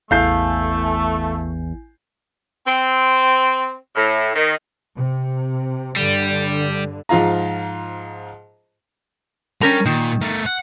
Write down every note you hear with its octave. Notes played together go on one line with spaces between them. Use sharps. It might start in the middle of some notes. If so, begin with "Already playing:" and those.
A1 E2 A3 E4 F5 G#5 G6 C7
C4
A2
D#3
C3
G2 D3 G3
G#2 F3 F4 F5 A#5
G3 C#4 A#4 G5 A#5
A#2 D#3
A3 A#4
F#5